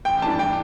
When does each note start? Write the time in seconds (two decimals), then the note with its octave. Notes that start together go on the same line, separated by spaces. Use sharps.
0.05 A1 G5
0.22 G2 E3 A3 D4 A5
0.39 G5